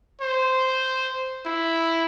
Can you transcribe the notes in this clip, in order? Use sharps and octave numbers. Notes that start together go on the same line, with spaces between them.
C5
E4